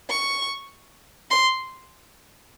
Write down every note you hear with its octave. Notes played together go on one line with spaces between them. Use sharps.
C#6
C6